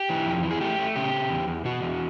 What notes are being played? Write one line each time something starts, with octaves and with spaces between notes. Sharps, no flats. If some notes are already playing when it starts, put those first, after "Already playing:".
Already playing: G4
E3
F2
E3
G#4
A3 G4
A3
C#3 G4
C#3
E2
E2
B2 F#4
E2